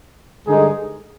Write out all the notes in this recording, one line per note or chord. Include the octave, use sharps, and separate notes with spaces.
G2 D3 G#3 D#4 G#4